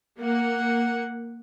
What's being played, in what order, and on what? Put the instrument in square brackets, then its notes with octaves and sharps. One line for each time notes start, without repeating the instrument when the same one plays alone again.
[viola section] A#3 F#5